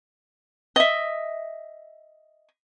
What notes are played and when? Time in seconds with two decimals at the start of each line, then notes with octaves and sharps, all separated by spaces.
0.76 D#5 E5